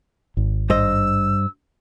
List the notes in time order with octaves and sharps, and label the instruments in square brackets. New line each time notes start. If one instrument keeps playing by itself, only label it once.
[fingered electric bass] G#1
[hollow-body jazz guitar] G2 C5 D#5 [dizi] E6